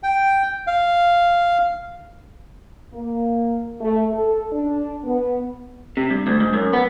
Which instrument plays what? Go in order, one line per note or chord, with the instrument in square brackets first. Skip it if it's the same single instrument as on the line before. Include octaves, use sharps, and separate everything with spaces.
[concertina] G5
F5
[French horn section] A#3
A3
A4
D4
B3
[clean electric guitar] C3
G2
D2
G#2
F#2
B3